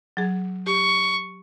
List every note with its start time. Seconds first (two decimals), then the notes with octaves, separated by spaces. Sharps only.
0.17 F#3 G#4
0.67 G4 C#6